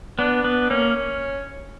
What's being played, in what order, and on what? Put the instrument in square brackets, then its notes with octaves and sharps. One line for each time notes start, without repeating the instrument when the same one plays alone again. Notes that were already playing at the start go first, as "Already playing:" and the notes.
[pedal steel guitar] B3 [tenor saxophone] D4
[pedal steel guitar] B3
[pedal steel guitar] A#3 [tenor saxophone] C#4